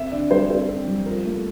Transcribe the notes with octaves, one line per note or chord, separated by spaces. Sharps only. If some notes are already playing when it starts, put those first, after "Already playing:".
Already playing: C4 E5
D3 D5
G3 C5
C4 C5
C4
G3
F3 A#4
A3